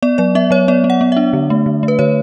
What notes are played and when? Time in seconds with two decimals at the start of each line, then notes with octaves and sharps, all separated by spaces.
0.03 B3 D5
0.18 F#3 D5
0.35 B3 E5
0.51 F#3 C#5
0.68 B3 D5
0.84 B3
0.90 F#5
1.01 B3
1.12 D4 E5
1.33 D3
1.50 A3
1.66 D3
1.83 A3
1.88 B4
1.99 D3 C#5